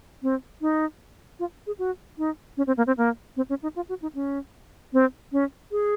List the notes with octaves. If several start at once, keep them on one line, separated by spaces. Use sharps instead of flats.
C4
D#4
F4
G#4
F#4
D#4
C#4
C4
A#3
C4
A#3
C4
C#4
D#4
F4
F#4
D#4
C#4
C4
C#4
G#4